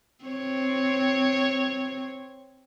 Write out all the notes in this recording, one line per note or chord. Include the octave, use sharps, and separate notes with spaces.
C4 C#5